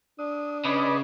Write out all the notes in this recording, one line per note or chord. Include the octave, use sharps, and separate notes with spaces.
D4 D#6
C#3 B4 D5 D#5